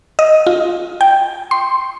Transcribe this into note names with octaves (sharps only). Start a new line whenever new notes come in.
D#5
F4
G5
C6